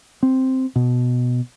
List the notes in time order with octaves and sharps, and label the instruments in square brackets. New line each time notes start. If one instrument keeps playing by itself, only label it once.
[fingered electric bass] C4
B2